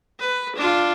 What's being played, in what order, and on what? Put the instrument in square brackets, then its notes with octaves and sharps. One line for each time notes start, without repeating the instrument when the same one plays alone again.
[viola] B4
D4 F4